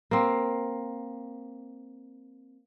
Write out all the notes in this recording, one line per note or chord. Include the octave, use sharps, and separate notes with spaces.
A#3 C4